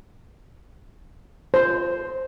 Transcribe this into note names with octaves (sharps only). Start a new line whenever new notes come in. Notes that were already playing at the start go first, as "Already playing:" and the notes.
C5